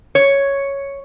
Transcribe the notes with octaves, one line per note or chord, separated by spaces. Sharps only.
C#5